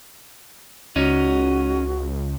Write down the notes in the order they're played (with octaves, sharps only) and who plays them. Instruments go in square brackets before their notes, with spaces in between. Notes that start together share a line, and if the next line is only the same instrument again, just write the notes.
[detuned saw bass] C#2 [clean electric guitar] C#4 D#4 [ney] F#4